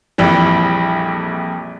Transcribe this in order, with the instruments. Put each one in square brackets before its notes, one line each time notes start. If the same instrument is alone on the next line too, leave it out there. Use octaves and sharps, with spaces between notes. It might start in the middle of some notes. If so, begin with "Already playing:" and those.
[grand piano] A#1 F2 E3 G3